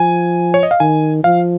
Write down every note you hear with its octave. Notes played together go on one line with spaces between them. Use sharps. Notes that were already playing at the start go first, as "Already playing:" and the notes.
Already playing: F3 G#5
C#5
D#5
F5
D#3 G#5
F3 F5